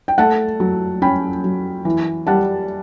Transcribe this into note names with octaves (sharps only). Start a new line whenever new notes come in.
G5
A3 F#5 A5
F#3
C#4 G5 B5
F#3
E3
G3 F#5 A5